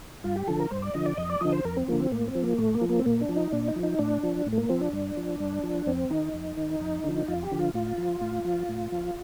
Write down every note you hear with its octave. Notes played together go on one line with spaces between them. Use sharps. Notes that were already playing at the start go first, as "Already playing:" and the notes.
G2 F4
G4
D3 F3 A4
A#4
G2 C5
D5
D3 F3 D#5
D5
F2 D#5
D5
D3 F3 D#5
C5
F2 A#4
C4
D3 F3 A#3
C4
A2 A#3
C4
F3
A#3
A2 A3
A#3
F3
A#3
C4
A#2 A#3
D4
F3
D#4
A#2 D4
D#4
F3
D#4
A2 D4
F3
A2
A3
A#3
F3 C4
D4
G2
F3
G2
F3
F2 C4
D#3 D#4
F2
D#3
F2
D3 F3
F2 F4
G4
D3 F3
F4
A2 F4
F3
A2
F3
A2
F3